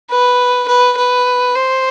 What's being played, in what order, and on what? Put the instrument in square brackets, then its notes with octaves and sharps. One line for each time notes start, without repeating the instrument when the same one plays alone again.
[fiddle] B4
B4
B4
C5